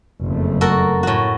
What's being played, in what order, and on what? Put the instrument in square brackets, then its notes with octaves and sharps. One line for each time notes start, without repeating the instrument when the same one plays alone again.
[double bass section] F#1 F2 A3
[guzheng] F#4 A4 A#4
A2 F#4